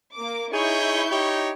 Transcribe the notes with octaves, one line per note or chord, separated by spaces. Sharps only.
A#3 D6
D#4 E4 G#4 C#5 C#6 G6
D#4 G4 C#5